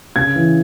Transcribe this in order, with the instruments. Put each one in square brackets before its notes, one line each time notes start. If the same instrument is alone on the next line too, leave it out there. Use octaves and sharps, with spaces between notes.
[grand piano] C#3 G#6
E3